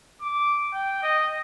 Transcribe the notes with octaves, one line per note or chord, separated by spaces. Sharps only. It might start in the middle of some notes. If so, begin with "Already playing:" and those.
D6
G5
D#5